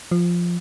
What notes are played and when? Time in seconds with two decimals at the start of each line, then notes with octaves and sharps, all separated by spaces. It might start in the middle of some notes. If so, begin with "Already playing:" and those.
0.11 F3